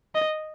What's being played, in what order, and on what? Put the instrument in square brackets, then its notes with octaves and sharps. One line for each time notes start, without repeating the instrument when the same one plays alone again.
[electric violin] D#5